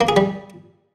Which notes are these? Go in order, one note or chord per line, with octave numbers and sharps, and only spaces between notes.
A#3
G#4
G3